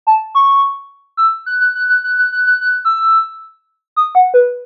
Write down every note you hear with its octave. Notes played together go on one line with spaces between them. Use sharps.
A5
C#6
E6
F#6
F#6
F#6
F#6
F#6
F#6
F#6
F#6
F#6
E6
D#6
F#5
B4